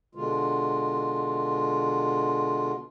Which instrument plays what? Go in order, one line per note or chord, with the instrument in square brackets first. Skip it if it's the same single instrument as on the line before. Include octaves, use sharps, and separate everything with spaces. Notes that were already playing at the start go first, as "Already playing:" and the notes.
[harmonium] B2 D3 G#3 F4